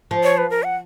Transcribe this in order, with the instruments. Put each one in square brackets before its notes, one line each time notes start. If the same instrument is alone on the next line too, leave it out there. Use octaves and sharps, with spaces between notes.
[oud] F3
[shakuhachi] C#5
B4
A#4
F#5